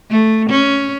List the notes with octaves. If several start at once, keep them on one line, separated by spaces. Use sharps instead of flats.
A3
C#4